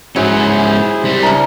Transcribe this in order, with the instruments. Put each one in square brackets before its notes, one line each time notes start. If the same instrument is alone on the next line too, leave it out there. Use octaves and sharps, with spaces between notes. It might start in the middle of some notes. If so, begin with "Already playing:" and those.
[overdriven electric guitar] G#2 C#4 [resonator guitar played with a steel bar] F#3 [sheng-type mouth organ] E4 G#4 C5
[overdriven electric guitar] G3 C4
[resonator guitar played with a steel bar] C#3 A#5 [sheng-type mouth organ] D4 E4 A#4